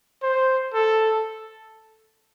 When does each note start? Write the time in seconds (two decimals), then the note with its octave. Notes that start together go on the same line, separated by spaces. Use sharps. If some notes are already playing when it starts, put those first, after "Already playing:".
0.23 C5
0.74 A4